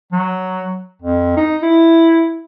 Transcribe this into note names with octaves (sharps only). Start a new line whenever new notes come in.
F#3
F2
D#4
E4